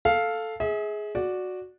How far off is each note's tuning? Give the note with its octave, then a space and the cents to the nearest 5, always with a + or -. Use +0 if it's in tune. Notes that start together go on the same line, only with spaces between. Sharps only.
A4 +0 F5 +0
G#4 +10 E5 -40
F#4 -10 D5 +0